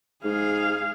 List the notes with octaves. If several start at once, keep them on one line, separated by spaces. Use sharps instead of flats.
G#2 G#4 F5